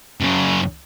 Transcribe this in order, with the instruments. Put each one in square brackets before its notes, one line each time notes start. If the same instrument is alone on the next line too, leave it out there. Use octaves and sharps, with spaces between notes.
[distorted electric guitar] F#2 C#3